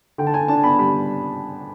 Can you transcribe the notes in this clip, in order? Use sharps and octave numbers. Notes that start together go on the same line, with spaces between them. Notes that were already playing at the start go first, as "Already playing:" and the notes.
D3 G5
A5
D3 G#5
D4 A5
B3 B5
G3 B5